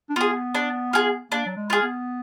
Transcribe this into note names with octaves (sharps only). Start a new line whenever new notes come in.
D4
B3 F4 G#4
D4
F4 G#4
A#3 D4
F#3
G#3
F4 G#4
B3